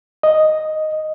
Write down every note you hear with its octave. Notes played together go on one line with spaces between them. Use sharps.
D#5